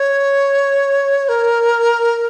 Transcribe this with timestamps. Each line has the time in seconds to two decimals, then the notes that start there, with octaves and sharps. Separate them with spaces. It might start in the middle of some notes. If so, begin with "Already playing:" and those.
Already playing: C#5
1.29 A#4